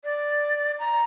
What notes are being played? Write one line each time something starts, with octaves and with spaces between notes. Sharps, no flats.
D5
A#5